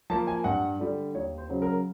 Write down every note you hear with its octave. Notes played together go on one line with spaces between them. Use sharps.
F3 A#3 A5
G#5
G2 F#5
D3 G3
D#2 C#5
C5
C#3 F#3
A#4